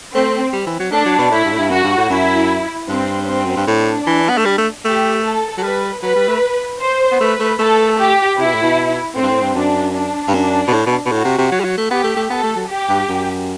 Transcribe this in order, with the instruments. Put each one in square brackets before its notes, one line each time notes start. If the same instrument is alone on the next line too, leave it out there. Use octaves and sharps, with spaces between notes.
[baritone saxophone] A3 [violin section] C4
[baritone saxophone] G3
E3
F#3
[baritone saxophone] A3 [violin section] D4
[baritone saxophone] F#3
B2
[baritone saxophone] A2 [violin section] E4
[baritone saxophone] G2
A2
G2
[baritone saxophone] F#2 [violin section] F#4
[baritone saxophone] G2
A2
[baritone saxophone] F#2 [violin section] E4
[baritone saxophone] G2 [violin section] C4
[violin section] C4
[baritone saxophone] F#2
G2
[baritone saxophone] A2 [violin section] D4
[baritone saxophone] E3
B3
A3
G3
A3
[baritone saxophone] A3 [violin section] G4
[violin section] A4
[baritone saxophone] F#3
[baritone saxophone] G3 [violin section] B4
[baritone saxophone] F#3 [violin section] B4
[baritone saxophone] G3
A3
[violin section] C5
[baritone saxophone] B3
[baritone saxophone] A3 [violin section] B4
[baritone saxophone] A3
[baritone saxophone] A3 [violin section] A4
[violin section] G4
[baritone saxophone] C3 [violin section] E4
[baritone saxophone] B2
A2
B2
[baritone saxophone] A2 [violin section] C4
[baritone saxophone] G2
A2
G2
[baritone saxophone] F#2 [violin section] D4
[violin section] D4
[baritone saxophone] G2
[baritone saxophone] F#2 [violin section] D4
[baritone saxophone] B2
A2
B2
B2
[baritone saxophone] A2 [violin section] F#4
[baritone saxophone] C3
C3
F#3
G3
F#3
A3
[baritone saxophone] B3 [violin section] G4
[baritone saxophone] A3
A3
[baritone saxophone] B3 [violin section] A4
[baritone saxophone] A3
F#3
[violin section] G4
[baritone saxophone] G2
F#2